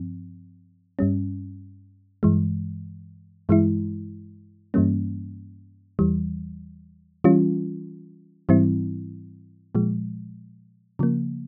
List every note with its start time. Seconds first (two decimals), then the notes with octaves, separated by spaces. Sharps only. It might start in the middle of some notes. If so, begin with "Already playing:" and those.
Already playing: G2 F3 C4
0.99 G2 G3 C#4
2.23 G2 E3 G#3
3.49 G2 E3 G#3 E4
4.74 G2 E3 G3 A#3 C#4
5.99 E2 E3 G3
7.24 E3 G3 C#4 F4
8.49 G#2 E3 G3 C4 E4
9.75 A#2 F3 G#3
10.99 C#3 F3 A#3